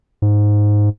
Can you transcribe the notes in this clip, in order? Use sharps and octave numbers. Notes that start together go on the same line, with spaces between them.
G#2